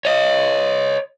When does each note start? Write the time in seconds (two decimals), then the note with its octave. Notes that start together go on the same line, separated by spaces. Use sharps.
0.05 C#5 D#5